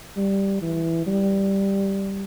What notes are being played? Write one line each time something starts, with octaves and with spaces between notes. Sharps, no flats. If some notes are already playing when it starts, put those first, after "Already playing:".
G3
E3
G3